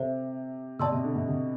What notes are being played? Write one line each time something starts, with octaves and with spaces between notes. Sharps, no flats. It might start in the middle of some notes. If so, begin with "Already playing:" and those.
Already playing: C3 A4 C5 E5
B2 D5 A5 C6 E6
C3
D3
C3
C3